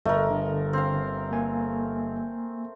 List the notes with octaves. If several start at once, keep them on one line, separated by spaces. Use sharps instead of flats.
G1 A3 A#4 D#5
D3
C4 F5
A#3 G#5